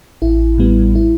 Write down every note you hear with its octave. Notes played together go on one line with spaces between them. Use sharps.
A1 E4
A2 G3 B3
E4